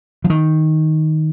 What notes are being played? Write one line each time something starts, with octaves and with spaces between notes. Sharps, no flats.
F3
D#3